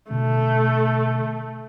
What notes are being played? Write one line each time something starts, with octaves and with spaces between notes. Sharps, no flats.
B2 D3 A3